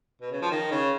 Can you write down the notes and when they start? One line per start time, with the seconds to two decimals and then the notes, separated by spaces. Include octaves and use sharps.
0.21 B2
0.32 C#3
0.42 F3
0.51 D#3
0.71 C#3